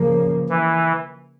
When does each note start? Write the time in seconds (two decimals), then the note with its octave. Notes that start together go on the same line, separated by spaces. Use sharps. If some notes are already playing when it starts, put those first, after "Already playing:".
Already playing: C#3 F3 A#3
0.49 E3